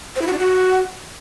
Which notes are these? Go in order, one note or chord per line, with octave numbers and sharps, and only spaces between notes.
C5
E4
F#4
D4
F#4